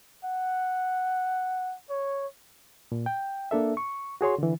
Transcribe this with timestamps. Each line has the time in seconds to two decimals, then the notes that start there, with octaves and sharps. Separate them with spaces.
0.25 F#5
1.90 C#5
2.92 A#2
3.06 G5
3.51 A#3 D4 A4 E5
3.77 C#6
4.21 F#4 G#4 C#5 C6
4.38 D3 E3